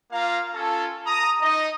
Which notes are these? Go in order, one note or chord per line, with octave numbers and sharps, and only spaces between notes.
A#3 F4 F5 A#5
C#4 F4 A4
A#5 D#6
D#4 D#5